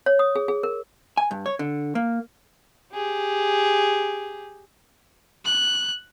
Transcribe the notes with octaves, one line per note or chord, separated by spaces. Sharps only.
C#5
D#6
G#4
G#4
A#4
G#5
G2
C#5
D3
A#3
G4 G#4
F#6